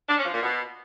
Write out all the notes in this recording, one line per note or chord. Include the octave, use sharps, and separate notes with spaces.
D4
C#4
F3
A#2
B2